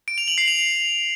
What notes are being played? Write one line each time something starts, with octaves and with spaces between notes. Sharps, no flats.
D7
F7
F#7
C7
F7